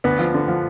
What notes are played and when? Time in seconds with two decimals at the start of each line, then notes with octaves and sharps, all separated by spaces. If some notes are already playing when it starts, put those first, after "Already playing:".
0.04 D2 B3
0.19 F3
0.34 D3
0.48 F3